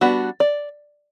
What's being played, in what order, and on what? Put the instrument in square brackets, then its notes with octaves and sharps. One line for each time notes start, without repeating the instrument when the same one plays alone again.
[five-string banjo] G3 B3 D4 F#4
D5